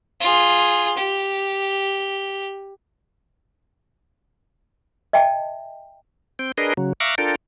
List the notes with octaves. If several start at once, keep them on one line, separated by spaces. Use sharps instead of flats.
F4 G#4
G4
D#5 E5 G5 A5
C4 G5
D4 G#4 A#4 B4 D#5
C#3 F#3
E5 F5 A#5 C#6 D6 F#6
D4 F4 A4 A#4 G5